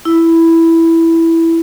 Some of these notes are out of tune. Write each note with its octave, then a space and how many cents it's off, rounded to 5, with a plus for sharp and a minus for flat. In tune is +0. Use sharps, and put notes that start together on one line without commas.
E4 +0